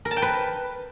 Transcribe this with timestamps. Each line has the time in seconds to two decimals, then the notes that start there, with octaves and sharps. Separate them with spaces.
0.05 A#4
0.11 A5
0.17 G5
0.22 B4